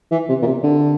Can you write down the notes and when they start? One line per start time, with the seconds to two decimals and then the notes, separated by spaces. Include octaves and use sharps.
0.11 E3
0.29 C3
0.42 A#2
0.47 C3
0.63 D3